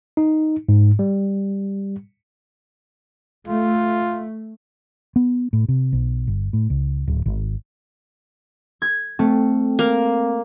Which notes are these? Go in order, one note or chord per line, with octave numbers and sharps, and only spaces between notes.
D#4
G#2
G3
A3 F4
B3
A2
C3
B1
G1
A2
C#2
D1
G#1
G#6
A3 C4
A#3